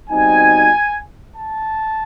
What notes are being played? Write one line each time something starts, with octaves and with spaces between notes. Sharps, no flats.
B2 G3 C4 D#4 G#5
A5